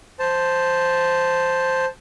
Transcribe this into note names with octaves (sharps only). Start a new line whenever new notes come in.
C5 A5